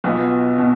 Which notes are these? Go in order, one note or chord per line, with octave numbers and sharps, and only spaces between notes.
B1 B2 B3 F4
B2